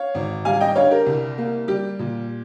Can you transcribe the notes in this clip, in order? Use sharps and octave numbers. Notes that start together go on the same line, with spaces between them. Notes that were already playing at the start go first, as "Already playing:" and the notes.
Already playing: C#5 F5
G#1
G3 F5 G#5
D#5 G5
G2 C#5 F5
G4 A#4
C2
A#3
G3 G4
A#2